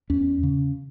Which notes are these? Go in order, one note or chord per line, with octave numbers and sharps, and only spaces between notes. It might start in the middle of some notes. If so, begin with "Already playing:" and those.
E2 C#4
C#3